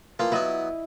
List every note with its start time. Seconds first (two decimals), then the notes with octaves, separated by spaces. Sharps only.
0.19 E3 F3 A#3 F4
0.32 F#3 B3 E4 D#5